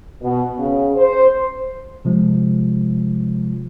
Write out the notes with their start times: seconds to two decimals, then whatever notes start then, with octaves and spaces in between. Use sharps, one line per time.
0.23 B2
0.58 C#3
0.97 C5
2.05 C3 F3 G#3